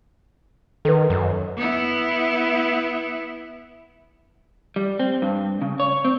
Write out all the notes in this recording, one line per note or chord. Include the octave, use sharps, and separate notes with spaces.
D#3 A4 B4
F#2
B3 E4
G3
C4
G2
C#3
C#5
C4